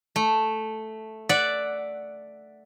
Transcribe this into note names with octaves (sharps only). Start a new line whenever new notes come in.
A3
D5 E5 F#5